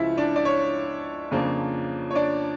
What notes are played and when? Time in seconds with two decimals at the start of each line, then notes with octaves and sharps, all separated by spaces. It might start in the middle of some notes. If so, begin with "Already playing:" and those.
Already playing: C#2 C#3 F3 E4 F4 E5
0.17 D4 D5
0.36 D5
0.45 C#5
1.31 F2 C#3 F3 A#3 D4
2.11 C#5
2.15 D4 D5